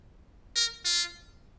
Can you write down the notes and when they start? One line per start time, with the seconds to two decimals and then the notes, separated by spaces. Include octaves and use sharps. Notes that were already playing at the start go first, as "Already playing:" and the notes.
0.56 A#4
0.85 F4